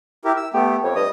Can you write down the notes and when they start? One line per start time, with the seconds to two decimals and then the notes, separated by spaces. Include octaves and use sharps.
0.25 E4 G4 A#4
0.37 E6
0.54 A3 B3 G4
0.84 F2 C#5
0.95 G2 D#5 D#6